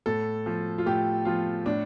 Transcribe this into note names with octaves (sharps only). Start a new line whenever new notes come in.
A2 A4
F3
F4
A2 G4
F3 F4
A2 D4